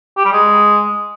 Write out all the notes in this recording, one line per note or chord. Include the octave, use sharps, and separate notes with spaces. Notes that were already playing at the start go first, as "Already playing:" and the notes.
G4
G3
G#3